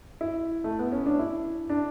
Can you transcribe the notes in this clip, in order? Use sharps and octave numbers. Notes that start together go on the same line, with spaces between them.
E4
A3
B3
C#4
D4
E4
D4